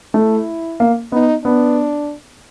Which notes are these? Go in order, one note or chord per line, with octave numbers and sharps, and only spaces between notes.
A3 E4
A#3
B3 D#4
B3 D4